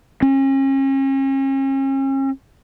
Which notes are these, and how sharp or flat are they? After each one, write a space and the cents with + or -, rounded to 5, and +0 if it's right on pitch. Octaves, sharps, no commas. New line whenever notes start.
C#4 -40